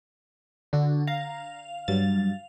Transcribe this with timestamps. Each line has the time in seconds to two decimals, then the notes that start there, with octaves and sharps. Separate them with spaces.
0.73 D3 D4 F#4
1.07 F5 A#5
1.88 G2 F#3 A6